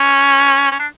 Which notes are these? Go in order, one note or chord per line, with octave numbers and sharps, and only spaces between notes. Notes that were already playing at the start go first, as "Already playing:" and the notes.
Already playing: C#4
C#4
D4